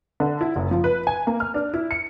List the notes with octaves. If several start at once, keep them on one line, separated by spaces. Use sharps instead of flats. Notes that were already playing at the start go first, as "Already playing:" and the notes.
D3
E4
F#1
F3
B4
G#5
A#3
F6
D4
E4
C#7